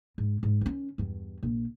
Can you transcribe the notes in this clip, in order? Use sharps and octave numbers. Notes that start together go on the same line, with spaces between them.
G#2
G#2
D#3 C#4
E2 G2
A#1